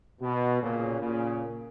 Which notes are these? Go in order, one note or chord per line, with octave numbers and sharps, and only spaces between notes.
B2
A#2 C#3
A#2 C#3